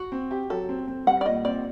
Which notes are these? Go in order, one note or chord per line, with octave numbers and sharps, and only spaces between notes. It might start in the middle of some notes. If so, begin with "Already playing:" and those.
Already playing: F#4
C4
G4
F#3 A4
C4
C4
G3 F#5
D5
A#2 D#5
C4 D5